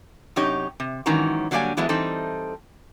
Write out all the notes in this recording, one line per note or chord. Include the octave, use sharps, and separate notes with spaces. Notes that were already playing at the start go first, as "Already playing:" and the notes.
F#2 C3 D#4 G4 C#5
C3
G#2 D#3 E3 F#3 C#4 A#5
D3 F#3 G3 A#3 D5 G#5
E3 F#3 G#3 A3 B3 E4
E3 G3 C4 D#4 A4